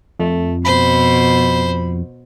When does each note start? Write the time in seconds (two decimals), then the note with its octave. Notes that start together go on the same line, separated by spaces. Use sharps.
0.19 F2 A3
0.65 B2 C5 B5